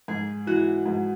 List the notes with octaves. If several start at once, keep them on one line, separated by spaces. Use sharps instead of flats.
G#2 G#4
E3 F#4
G#2